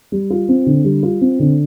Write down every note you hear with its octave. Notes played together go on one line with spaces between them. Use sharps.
G3
F4
C4
D3
G3
F4
C4
D3